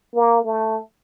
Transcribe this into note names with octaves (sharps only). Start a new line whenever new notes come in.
A#3
A3